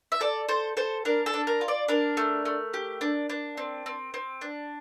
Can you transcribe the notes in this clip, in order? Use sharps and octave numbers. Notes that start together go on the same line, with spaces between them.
E5
A4 D5
A4 C5
A4 C5
D4 A#4
A4
D4
A#4
F4
D5
D4 A#4
A3
A3
G4
D4
D4
C4
C4
C4
D4